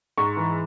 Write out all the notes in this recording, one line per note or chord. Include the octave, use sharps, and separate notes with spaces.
G#2 C#6
E3